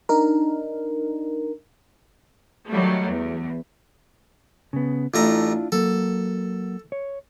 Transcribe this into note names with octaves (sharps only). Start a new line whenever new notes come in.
D4 D#4 A#4
D#3 F#3 G3 A3
E2
C#3 B3
A1 A3 D4 E4 F4 A#5
F#3 A#3 A4
C#5